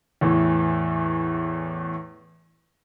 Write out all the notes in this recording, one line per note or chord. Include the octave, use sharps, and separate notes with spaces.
E2 A2 E3